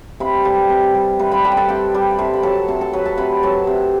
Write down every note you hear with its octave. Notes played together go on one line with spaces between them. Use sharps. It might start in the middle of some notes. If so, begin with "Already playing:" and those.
C3 B4 B5
G3 A4 A5
C3
G3
C3 B4 B5
B4 B5
G3 A4 A5
B5
A4 A5
C3 G4 G5
G3
B5
C3 A4 A5
B5
F#3 A4 A5
C3 A4 A5
A4 A5
F#3 B4 B5
A4 A5
C3 B4 B5
F#3 A4 A5
C3